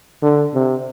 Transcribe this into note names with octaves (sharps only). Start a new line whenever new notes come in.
D3
C3